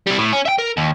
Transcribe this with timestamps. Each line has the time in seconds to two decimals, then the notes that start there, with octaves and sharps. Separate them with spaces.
0.07 G3 E4
0.18 A2
0.33 C#4
0.46 E5 G5
0.59 A#4
0.77 D#2